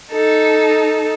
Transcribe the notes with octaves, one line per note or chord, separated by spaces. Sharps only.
D#4 A4